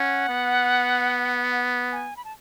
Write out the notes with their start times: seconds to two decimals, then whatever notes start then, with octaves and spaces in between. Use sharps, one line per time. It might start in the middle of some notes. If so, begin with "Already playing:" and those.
Already playing: C#4 F#5
0.29 B3
1.92 G#5
2.17 B5
2.25 A5